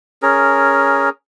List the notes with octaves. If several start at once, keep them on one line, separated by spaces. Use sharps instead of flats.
C#4 G#4 A#4